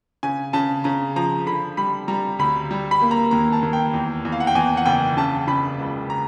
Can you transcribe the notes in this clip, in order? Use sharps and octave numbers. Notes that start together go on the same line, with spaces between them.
C#3 G#5
C#3 A5
C#3 A#5
F3 A#5
D3 B5
G3 B5
G3 A#5
D2 B5
G3
B5
A#3
A#5
D#2 A#5
A5
D#2
G5
E2
E2
F5
F#5
G5
E2 G#5
F#5
F#1 G5
C#3 A5
C#3 B5
C#2
A#5